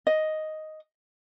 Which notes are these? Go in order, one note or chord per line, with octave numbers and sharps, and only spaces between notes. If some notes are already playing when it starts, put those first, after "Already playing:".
D#5